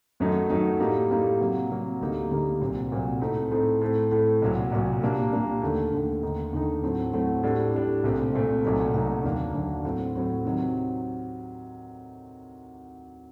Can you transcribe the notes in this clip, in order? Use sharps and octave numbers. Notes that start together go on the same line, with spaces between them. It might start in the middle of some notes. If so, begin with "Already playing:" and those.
F#2 D#3 F#3 A3 D#4
F#2 D#3 F#3 A3 D#4
A2 G3 A#3 D#4
A2 G3 A#3 D#4
C3 F#3 A#3
C3 F#3 A#3
D2 D3 G3 A#3 D#4
D2 D3 G3 A#3 D#4
C2 A#2 F#3 C4
C2 A#2 F#3 C4
A2 A3 C4 D#4
A2 A3 C4 D#4
A2 A3 C4
A2 A3 C4
C2 A#2 F#3
C2 A#2 F#3
A#2 G3 A#3 D4
A#2 G3 A#3 D4
D#2 D3 A3
D#2 D3 A3
D#2 D3 A3 D#4
D#2 D3 A3 D#4
A2 F#3 A3 C4
A2 F#3 A3 C4
A2 G3 D4
A2 G3 D4
C2 A#2 A3 C4
C2 A#2 A3 C4
C2 A#2 F#3 A3 D#4
C2 A#2 F#3 A3 D#4
D#2 D3 F#3 A#3 D4
D#2 D3 F#3 A#3 D4
A2 F#3 C4
A2 F#3 C4
C3 D#3 F#3 C4